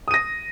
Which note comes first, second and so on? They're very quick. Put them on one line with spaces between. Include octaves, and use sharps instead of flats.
D#6 D#7 A#6